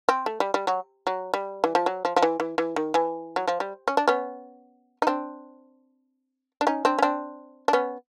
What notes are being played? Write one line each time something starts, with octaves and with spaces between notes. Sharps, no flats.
C4
A3
G3
G3
F#3
F#3
G3
E3
F3
F#3
F3
F3
E3
E3
E3
D#3
E3
F#3
F3
G3
C#4
D4
B3 C#4
D#4
C4 D4
D4
C#4 D#4
C4 D4
C#4
C4 D4
D4
B3 C#4